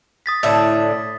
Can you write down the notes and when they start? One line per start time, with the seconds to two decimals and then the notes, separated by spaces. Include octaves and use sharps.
0.26 D#6 A6 B6
0.43 A2 D3 E5